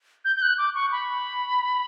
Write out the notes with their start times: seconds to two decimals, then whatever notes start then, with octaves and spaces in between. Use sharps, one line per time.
0.25 G6
0.36 G6
0.42 F#6
0.58 D6
0.75 C#6
0.92 B5